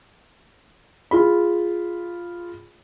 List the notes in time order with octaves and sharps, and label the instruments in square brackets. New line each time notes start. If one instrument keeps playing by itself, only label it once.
[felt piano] F4 G#4 B5